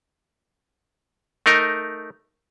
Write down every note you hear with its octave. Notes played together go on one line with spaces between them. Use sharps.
A3 D#4 A#4